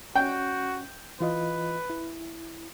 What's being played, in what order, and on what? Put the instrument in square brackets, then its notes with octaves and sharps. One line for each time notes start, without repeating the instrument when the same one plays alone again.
[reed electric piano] C#4 [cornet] F#4 [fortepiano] G5
[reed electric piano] E3 F4 D#5 [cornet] B4
[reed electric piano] E4